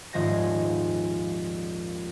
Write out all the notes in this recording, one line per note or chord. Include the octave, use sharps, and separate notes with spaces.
D#1 G#2 F3 G#3 G#5 A#6